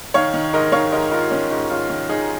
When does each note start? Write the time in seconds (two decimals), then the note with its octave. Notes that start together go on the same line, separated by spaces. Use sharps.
0.14 D#3 C#5 F5
0.34 D#3
0.53 G#2 A#4 D#5
0.72 D#3 C#5 F5
0.92 G#2 A#4 D#5
1.11 G#2 F4 A#4
1.31 D#3 C#4
1.51 G#2
1.70 G#2 C#4 F4
1.90 D#3
2.09 D#3 D#4 G#4